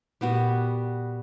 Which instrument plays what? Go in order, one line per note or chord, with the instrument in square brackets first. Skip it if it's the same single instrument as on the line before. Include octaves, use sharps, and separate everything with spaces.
[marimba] A#2 [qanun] G3 B3 F#4